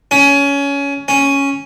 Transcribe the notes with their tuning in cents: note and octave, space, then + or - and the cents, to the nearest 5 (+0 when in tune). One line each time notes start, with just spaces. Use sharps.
C#4 +20
C#4 +0